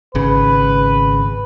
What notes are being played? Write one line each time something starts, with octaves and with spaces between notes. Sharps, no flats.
G#1 C#3 B4